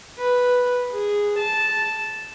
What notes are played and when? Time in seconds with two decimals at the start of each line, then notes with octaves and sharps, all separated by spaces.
0.19 B4
0.92 G#4
1.39 A5